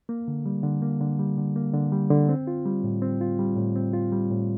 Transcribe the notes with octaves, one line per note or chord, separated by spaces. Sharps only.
A#3
D3
G3
D3
A#3
D3
G3
D3
A#3
D3
G3
D3
C4
F4
G3
A2
C4
F4
G3
A2
C4
F4
G3
A2